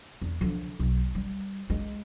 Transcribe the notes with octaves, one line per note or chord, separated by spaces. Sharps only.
E2
D3 F3
B1
G3
G#3